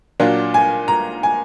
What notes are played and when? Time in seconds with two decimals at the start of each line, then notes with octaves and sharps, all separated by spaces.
0.20 A#2 F#3 D4 F4
0.54 G#5
0.88 A#5
1.23 G#5